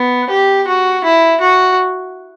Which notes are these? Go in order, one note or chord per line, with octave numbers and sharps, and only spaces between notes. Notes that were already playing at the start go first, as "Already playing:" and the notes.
Already playing: B3
G4
F#4
E4
F#4